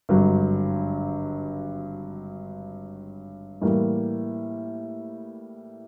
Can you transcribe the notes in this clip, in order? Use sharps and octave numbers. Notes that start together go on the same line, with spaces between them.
G#1 G2 D3 F#3
A2 E3 G3 A#3